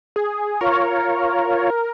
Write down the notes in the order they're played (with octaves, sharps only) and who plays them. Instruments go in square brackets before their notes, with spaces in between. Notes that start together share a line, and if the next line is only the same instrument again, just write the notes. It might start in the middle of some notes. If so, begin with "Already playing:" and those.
[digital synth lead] G#4
[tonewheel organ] F4 C#5 [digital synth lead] A#4